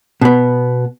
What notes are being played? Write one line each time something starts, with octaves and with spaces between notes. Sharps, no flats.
B2 B3